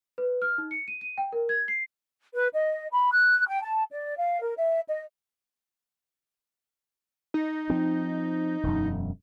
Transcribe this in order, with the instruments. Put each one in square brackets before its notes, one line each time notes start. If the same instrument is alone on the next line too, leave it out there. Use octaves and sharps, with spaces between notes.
[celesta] B4
F6
D#4
C#7
D#7
D#7
G5
A#4
G#6
C7
[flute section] B4
D#5
B5
F#6
G5
A5
D5
F5
A#4
E5
D#5
[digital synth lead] D#4
[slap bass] F3 C4
E1 F#2